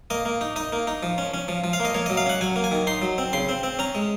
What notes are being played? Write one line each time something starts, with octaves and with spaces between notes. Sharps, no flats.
A#3 D#5
A#3
D#4
D#4 D#5
A#3
D#4
F3
C#4
C#4
F3
F3
F5
A#3 D#5
A#3 C#5
D#5
F#3
F5
C#4 F#5
F#3 G#5
A#3
G#5
D#3
D#4 C6
F#3
C4
C#3 C6
C4
C4
C#4 A#5
G#3